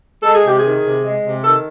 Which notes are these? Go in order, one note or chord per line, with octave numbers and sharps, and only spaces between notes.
G#3 A4
G#4
C3 G4
D#3 G#4
C3
G#3
C3
D#3 A4